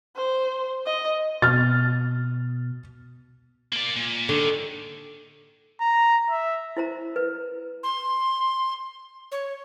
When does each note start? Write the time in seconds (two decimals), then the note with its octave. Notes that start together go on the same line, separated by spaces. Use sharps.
0.16 C5
0.86 D#5
1.42 B2 F6 A6
3.72 A#3 D5
3.96 A#2
4.29 D3 D#3
5.81 A#5
6.30 E5
6.77 E4 C5 A#5
7.16 B4
7.83 C6
9.32 C#5